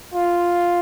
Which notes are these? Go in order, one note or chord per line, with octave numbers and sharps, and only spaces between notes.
F4